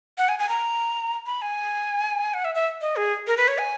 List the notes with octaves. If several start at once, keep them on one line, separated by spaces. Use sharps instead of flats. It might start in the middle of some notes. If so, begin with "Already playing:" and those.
F#5
G#5
G#5
A#5
B5
G#5
F#5
E5
E5
D#5
G#4
A#4
B4
C#5
G#5